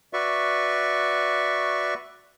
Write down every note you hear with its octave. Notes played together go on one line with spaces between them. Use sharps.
F#4 B4 D5 E5 C#6